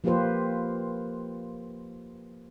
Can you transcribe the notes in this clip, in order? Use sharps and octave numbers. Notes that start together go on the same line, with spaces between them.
F3 A#3 F4 G4 B4 C5